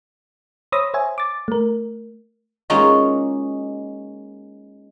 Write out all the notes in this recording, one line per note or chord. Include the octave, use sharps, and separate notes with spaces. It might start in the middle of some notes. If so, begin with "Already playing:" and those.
C5 C#5 B5 D#6 E6 A#6
C5 C#5 E5 G#5
D6 A6
A3 A#4
G#3 A#3 C#4 D#4 F4 F#4